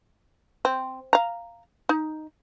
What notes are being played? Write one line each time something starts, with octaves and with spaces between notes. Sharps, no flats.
C4
F5 A#5
D#4